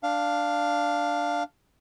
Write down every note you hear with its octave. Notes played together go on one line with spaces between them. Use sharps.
D4 F5